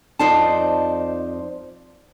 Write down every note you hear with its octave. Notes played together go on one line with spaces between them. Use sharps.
F2 F3 D#4 C5 D5 A5